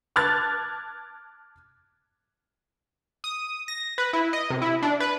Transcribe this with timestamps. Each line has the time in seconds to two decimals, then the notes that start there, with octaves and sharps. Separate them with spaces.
0.16 A5 D6 F6 F#6 G#6 A6
3.24 D#6
3.68 A#6
3.98 B4
4.13 E4
4.33 D#5
4.50 C3
4.62 E4
4.82 D4
5.00 B4